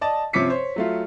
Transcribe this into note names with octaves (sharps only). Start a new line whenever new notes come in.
D5 D#5 A5
C3 F3 C#4 D6 B6 C#7
C5 C#5
F#3 A3 F4